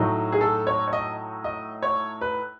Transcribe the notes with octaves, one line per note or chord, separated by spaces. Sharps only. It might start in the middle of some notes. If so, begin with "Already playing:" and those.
Already playing: A2 F#3 A3 D#4
G#4
A4
C#5
C#5
D#5
D#5
C#5
B4